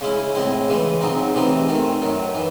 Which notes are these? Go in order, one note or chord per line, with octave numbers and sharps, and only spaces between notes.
C#3 G#3 C#4 E4
A2 G#3 C4 E4
C#3 E3 G#3
C#3 F#3 C4 D#4
C3 E3 A3 C4 D#4
D#3 A3 C4
F#2 D#3 F#3
E3